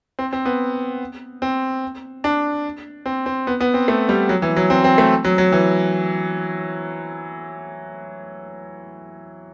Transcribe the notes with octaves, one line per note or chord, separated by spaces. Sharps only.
C4
C4
B3
C4
D4
C4
C4
B3
B3
C4
A3
G3
F#3
E3
F#3
C4
C4
A3
F#3
F#3
E3